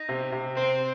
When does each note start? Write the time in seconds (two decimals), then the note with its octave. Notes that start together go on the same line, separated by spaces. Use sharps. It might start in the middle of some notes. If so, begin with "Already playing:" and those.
Already playing: D#4
0.09 C3
0.32 C3
0.56 C4 C5